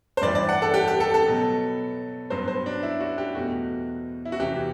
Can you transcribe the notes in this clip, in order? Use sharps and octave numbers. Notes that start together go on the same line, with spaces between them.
C5
G2 E3 G3 D5
D5
F#5
A4
G4
G4
A4
A4
B2 F#3 B3
G2 F#3 B3 C5
C5
D4
E4
F#4
G4
E2 B2 A3 F#4
E4
F#4
E2 C3 E3 G4